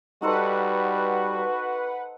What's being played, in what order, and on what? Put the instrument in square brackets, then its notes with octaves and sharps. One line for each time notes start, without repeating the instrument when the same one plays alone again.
[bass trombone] G3 [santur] D#4 A4 C5 [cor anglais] F#4 [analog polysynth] B4 F#5